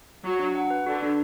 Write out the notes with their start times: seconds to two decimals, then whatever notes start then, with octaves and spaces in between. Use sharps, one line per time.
0.24 F#3 F#4
0.39 D4
0.55 F#5
0.70 B4
0.86 D3 F#4
1.02 D4